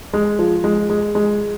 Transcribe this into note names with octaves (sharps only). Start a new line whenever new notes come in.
G#3
F3
G#3
G#3
G#3